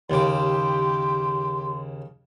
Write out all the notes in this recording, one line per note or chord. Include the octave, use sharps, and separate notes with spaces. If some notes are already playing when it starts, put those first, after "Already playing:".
D#2 C#3 G4 C6 D6